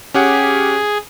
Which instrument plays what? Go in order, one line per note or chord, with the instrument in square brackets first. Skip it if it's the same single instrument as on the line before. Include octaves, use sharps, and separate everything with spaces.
[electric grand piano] C#4 G4 F#5 [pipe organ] G#4